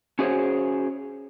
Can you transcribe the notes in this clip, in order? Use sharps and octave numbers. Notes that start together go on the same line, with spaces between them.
C#4 F#4 G#4 C5 C#5